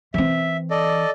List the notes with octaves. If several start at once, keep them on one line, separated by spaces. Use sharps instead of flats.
E3 C4 E5
A4 D5 D#5